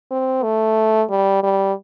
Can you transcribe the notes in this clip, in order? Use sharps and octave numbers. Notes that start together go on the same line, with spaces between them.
C4
A3
G3
G3